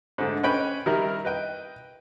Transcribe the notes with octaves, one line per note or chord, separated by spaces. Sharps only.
G#2 D3 A3
C#4 B4 D#5 G5 B5
D#3 G3 E4 A#4
B4 D#5 G5